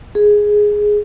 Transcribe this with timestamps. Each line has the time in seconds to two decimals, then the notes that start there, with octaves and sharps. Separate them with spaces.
0.15 G#4